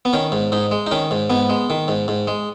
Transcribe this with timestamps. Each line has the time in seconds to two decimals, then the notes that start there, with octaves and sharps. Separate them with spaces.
0.05 B3
0.13 D#3 C#4
0.32 G#2
0.52 G#2 D#4
0.71 G#3
0.87 D#4
0.91 D#3 C#4
1.11 G#2
1.30 G#2 B3
1.50 G#3
1.70 D#3
1.88 G#2
2.08 G#2
2.28 G#3